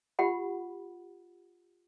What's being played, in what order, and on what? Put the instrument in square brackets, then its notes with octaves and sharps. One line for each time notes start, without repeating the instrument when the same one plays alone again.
[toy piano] F4 G4 F#5 B5